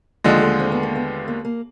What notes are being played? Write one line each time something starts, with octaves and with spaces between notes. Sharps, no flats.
D#2 D3 F3 G#3 D#4
A#3
A3
C4
B3
A#3
B3
A#3
A#3